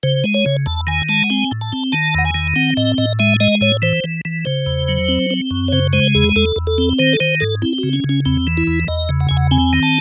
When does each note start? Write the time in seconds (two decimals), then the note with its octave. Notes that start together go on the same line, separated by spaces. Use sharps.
0.03 C#3 C5
0.24 G#3
0.34 C#5
0.46 C#3
0.66 E2 A5
0.87 D#3 G#5
1.09 G#3 A5
1.24 F#5
1.30 C4 G#5
1.51 A2
1.61 A5
1.72 C4
1.92 D#3 A5
2.14 E2 F#5
2.25 G#5
2.34 D#3
2.56 C4 F#5
2.77 A2 D#5
2.98 A2 D#5
3.19 G#3 E5
3.40 G#3 D#5
3.61 A2 C#5
3.82 E3 C5
4.04 E3
4.25 E3
4.45 C#3 C5
4.66 E2
4.89 F#3
5.08 C4
5.30 C4
5.51 F#2
5.68 C#5
5.72 C#3 C5
5.93 G#3 C5
6.15 E2 G#4
6.36 E2 A4
6.56 E2
6.67 A4
6.78 C4
6.99 D#3 C5
7.13 A4
7.20 D#3 C5
7.40 G#2 A4
7.62 C4 E4
7.78 F#4
7.83 C#3
7.93 C#4
8.04 C#3
8.09 C#4
8.25 E2 C4
8.47 E3
8.57 E4
8.67 E2
8.88 E2 D#5
9.09 C#3
9.20 F#5
9.29 E2 G#5
9.37 F#5
9.51 C4 G#5
9.73 D#3
9.83 A5